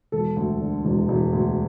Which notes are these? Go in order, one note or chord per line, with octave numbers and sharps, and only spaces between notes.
E1 A4
D2
D3
E1
E1
D2